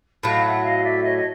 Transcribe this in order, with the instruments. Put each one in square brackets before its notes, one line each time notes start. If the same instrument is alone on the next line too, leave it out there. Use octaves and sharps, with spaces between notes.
[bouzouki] A2 F#3 A3 [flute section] D#5 F5
[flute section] E5 F#5
D#5 F5
F5
D5 E5
C#5 D#5
D#5